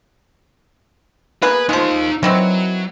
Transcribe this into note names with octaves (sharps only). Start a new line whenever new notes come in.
A#3 B3 G#4 B4
F3 G#3 D#4 F5
D#3 E3 F#3 C4